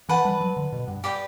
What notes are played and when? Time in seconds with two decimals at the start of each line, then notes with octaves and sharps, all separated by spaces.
0.09 E3 B4 F#5 A5
0.25 G3
0.41 F#3
0.57 D3
0.73 B2
0.88 G2
1.04 G4 B4 D5 G5